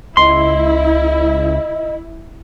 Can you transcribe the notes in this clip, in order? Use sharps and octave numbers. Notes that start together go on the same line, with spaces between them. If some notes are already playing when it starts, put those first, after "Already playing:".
C#2 E4 D#5 C6